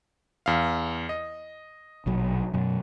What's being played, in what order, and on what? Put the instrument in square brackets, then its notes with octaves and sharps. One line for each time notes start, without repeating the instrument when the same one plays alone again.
[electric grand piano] E2 F5
D#5
[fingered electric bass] A#1 B2 F#3
F#2 B2 F#3